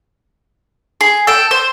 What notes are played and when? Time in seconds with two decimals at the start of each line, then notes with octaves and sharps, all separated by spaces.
1.01 G#4
1.27 A4 G5
1.51 C5